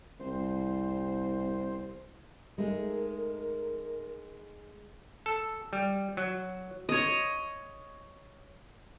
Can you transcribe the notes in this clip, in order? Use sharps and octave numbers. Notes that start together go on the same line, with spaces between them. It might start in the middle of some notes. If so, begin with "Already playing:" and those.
C2 C4 C5
G#3 A3 D#4 A#4
A4
G3
F#3
C#5 D#5